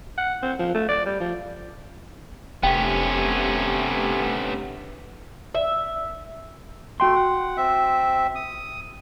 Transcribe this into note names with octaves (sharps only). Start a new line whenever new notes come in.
F#5
C4
F3
A3
D5
G3
F3
F1 G2 C3 A3 B3 C#4 G5
E5
A3 F#4 G5 C6
F#5
C4 E5
D#6